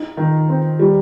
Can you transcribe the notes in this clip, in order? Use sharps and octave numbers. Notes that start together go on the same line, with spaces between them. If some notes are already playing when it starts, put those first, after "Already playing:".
Already playing: D#4
D#3
C4
G3